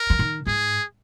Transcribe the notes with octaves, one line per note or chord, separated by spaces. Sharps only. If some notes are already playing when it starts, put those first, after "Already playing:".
Already playing: A#4
E3
D#3
G#2 G#4